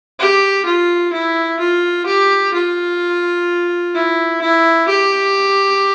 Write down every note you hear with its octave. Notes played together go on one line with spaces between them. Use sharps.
G4
F4
E4
F4
G4
F4
E4
E4
G4